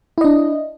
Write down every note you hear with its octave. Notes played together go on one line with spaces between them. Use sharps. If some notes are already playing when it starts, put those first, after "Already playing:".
D4 E4 D#5